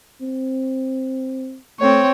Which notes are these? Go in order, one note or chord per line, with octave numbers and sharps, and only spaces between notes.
C4
A3 C4 C#5